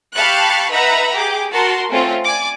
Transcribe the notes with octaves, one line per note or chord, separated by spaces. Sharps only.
G4 F5 A5 B5 C#6 F#6
D#4 B4 E5 F#5 A#5 B5
G4 G#4 D6
F#4 A#4 A5 C6
A3 C4 C#4 F4
D5 G#5 D6